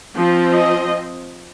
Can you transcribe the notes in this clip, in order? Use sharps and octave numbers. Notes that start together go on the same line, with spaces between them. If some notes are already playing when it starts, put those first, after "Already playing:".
F3 C4
D#5